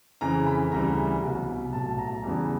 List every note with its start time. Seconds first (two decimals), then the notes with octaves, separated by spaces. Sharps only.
0.21 F2 C#3 E3 A#5
0.46 B5
0.71 D2 C#3 E3 G3 A#5
1.22 C2 B2 F#3
1.73 B1 A2 F#3 A5
1.98 A#5
2.07 A5
2.14 A#5
2.23 E2 C#3 E3 G3